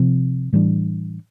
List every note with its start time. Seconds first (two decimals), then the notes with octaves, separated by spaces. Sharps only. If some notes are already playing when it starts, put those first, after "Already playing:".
Already playing: C3 F3 C4
0.52 A2 E3 G3 D4